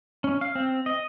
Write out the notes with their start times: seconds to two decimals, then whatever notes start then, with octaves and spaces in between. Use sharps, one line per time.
0.24 C#4
0.41 F5
0.55 C4
0.86 D#5